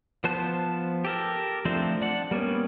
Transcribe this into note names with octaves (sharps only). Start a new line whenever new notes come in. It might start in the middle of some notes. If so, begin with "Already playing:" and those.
F3 B3 C5 A5 F#6
G4 A4 A#4
F3 A3 C4 D4 C5
D4 F#5
G3 A#3 B3 C#4